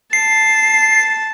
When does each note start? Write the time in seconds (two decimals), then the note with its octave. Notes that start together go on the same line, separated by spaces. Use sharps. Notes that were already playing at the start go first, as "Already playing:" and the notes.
0.13 A5 C7